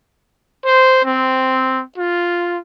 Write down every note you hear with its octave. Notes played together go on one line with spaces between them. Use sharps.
C5
C4
F4